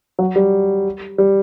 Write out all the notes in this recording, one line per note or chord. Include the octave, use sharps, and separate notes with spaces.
F#3
G3
G3